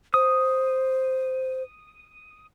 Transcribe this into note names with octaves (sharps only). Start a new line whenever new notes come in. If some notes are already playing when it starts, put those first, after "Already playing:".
C5 D#6